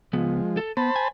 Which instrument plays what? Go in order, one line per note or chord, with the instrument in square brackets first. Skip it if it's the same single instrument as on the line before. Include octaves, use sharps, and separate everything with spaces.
[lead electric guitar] C#2 B3 [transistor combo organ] F3 G#3
[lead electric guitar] A4
[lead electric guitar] B3 [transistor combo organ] C5 A5 B5
[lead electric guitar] G#5